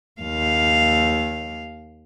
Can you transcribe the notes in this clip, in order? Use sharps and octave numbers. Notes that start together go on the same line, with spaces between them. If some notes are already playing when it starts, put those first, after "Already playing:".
D#2 F5